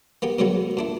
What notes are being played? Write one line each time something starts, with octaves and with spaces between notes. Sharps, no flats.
A#3 B3 G4
B2 D3 F#3 G#3 A#3 B3
A#2 D4 E4